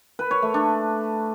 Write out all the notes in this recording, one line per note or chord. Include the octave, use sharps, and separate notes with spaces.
B4
C#5
A3
D4